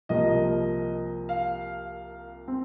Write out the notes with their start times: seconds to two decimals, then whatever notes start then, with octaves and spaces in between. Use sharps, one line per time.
0.09 C2 C3 F3 A#3 D#5
1.29 F5
2.48 C4